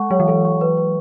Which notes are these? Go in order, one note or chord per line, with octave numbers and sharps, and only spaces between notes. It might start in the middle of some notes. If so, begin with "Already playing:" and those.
Already playing: G#3 A4 F#5 C#6
F#3 C#5
E3
F#3 A4
C#6
B4
B4